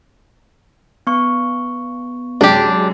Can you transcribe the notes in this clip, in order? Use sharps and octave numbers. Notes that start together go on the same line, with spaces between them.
B3 C#6
F#2 C3 G#3 D4 G4